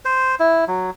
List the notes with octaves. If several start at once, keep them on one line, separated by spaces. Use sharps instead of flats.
C5
E4
F#3